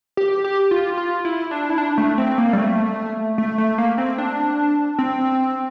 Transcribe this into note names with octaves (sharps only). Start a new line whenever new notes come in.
G4
G4
F4
F4
E4
D4
E4
D4
A3
C4
A#3
G3
A3
A3
A3
A#3
C4
D4
C4